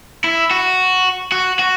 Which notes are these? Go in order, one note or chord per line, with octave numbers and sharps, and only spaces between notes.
E4
F#4
F#4
F#4